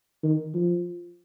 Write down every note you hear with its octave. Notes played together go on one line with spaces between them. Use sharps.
D#3
F3